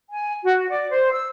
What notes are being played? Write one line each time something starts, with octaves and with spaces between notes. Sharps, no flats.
G#5
F#4
D5
C5
E6